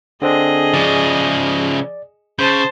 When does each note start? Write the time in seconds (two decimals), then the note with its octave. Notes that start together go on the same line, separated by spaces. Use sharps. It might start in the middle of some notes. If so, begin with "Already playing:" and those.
0.22 D3 C4 D4 G#4 D#5
0.74 C#3 F3 D5
2.39 C#3 C5 A5 G6